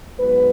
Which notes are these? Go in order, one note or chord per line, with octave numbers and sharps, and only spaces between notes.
G#2 F#3 B3 B4